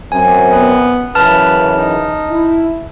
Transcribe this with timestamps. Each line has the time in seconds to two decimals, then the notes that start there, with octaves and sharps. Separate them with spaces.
0.12 F#2 C4 G#5
0.50 B3
1.15 F#2 C#3 E3 B4 A5 F6
1.76 D#4
2.29 E4